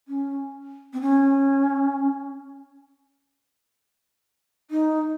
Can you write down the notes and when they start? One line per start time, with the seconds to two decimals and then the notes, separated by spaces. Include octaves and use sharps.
0.08 C#4
0.93 C4
1.01 C#4
4.71 D#4